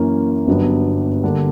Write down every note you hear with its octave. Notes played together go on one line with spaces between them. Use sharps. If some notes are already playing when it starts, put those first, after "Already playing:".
Already playing: F#2 E3 A#3 C#4
G1 G2 F#3 B3 D4
D3 G3 A#3 D4 A#4